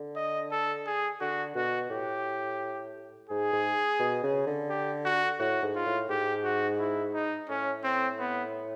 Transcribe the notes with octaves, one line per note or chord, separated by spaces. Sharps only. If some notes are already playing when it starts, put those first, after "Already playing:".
Already playing: D3
D#5
A4
G#4
D3 F#4
B2 F#4
A2 G4
G#2 G#4
G#2
B2
C#3
D3
G4
F#4
A2 F#4
G#2
F4
A2
G#2 G4
F#4
E4
D#4
A2 C#4
C4
B3